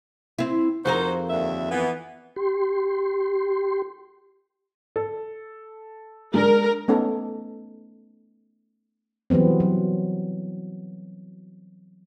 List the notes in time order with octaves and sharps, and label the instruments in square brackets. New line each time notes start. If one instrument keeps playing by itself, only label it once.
[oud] C4 E4
[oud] F2 G#4 A#4 [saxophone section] D#4 F#4 C5
[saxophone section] D#2 D3 E5
E3 B3
[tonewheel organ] G4 C6
[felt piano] A4
[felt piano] G#3 D4 [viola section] A#4
[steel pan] A3 B3 C#4 D#4 A4
[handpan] E3 F#3 G3 B3 C4
F#3